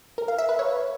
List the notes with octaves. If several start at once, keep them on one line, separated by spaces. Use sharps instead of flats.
A#4
F5
E5
B4
C#5